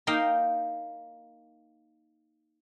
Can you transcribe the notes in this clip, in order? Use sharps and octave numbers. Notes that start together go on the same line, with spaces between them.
A#3 D#4 F5 G5